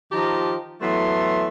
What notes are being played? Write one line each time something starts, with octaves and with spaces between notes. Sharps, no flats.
D#3 F3 G4 A5 A#5
E3 F#3 A3 B3 A4 C6